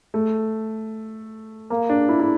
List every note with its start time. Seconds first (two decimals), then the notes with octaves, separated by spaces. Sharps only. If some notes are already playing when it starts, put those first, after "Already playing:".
0.14 A3
1.70 A#3
1.89 D4
2.09 E4
2.20 E4